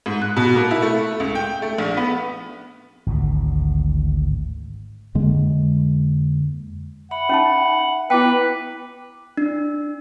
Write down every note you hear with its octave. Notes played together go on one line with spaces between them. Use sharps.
G#2
F#6
B2
A#3
E4
A3
C#2
G5
A3
A#1
B3
G#1 D2 A2
F2 D3 G#3 A#3
E5 F#5 B5
C#4 D#4 A5
B3 E4 B4 G5 D6
D4